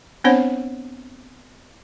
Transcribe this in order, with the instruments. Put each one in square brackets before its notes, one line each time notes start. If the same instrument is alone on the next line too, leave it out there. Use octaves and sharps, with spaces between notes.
[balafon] B3 C4 D4 C5 C#5 F#5